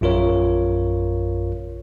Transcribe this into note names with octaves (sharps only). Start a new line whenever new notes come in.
A#1 F#2 F4 A#4 C#5